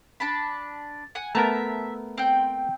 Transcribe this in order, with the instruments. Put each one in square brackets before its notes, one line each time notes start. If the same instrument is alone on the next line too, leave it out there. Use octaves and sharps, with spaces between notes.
[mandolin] D4 A5 B5
F#5 G#5
[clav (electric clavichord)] A3 B3 A#4 [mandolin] E5 A5 A#5
[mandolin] C4 G5